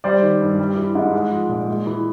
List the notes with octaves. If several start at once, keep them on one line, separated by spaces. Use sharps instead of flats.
G3 C5 D5
D#3
G2
G3
E3
G#2
G#3
F3
A#2
G#3
E3